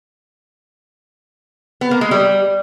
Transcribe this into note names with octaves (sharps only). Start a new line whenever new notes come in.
B3
A#3
G#3
G3